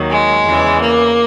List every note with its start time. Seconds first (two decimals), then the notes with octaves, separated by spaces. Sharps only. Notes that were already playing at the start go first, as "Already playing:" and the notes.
Already playing: D#2 D#3 F#3
0.10 G#3
0.45 E2 C#3 E3
0.80 A#3